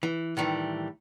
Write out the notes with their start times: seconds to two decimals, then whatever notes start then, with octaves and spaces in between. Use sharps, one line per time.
0.03 E3
0.37 A2 D#3 E3 G3